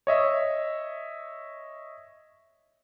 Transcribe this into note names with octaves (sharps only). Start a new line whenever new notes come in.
C#5 D#5 E5